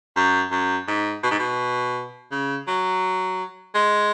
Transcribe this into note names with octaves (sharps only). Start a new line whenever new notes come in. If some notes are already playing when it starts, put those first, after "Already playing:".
F#2
F#2
G#2
B2
G#2
B2
C#3
F#3
G#3